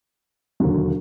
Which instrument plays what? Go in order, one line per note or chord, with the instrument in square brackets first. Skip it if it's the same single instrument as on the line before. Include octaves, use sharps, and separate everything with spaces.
[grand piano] E1 D#2 D3 F#3